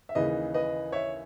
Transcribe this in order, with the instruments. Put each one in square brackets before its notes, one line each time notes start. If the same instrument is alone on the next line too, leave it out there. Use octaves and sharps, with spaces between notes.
[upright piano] E5
D#2 C#3 E3 B4 D#5
B4 D#5
C#5 E5